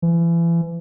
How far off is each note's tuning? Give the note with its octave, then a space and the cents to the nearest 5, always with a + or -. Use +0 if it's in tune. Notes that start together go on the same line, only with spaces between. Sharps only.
E3 +35